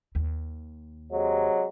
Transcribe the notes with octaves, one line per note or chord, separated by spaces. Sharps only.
D#2
C3 F#3 G#3